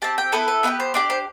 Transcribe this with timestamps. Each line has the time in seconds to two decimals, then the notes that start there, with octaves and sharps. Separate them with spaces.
0.02 C4 G4 A5
0.18 G5
0.32 B3 E4 A4 B4
0.48 B4
0.63 B3 E4 G4 B4
0.80 C5
0.94 D4 G4 D5
1.10 C5